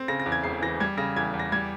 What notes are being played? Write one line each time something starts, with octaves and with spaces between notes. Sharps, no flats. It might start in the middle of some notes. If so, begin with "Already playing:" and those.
Already playing: C4
C#3 A#6
A#6
E2
G#6
E1 C7
E3 A#6
G3 G#6
C#3 A#6
E2 G#6
E2
A#6
G3 G#6